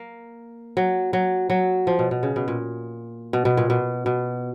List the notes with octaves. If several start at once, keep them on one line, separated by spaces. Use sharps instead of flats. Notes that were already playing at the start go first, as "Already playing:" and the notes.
Already playing: A#3
F#3
F#3
F#3
F3
B2
B2
C#3
B2
A#2
B2
B2
A#2
B2
B2